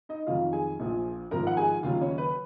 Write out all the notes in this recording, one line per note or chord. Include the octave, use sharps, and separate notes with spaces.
D#4 D#5
F2 D#3 F#3 F4 F5
G#4 G#5
A#1 A#2 F3
G#1 G#2 F3 A#4 A#5
F#5
G#4 G#5
D#2 C#3 F#3 F4 F5
C#4 C#5
B4